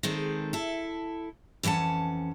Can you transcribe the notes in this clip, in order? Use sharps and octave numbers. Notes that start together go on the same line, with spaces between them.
D#3 G#3 C4 A4
E4 A4
F2 E3 C#4 F#5 A5